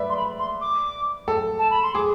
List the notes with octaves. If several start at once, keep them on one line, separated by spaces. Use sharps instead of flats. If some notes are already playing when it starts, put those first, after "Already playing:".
Already playing: B4 D5 E5
C6
B5
C6
D6
A4
A5
B5
C6
G#4 D6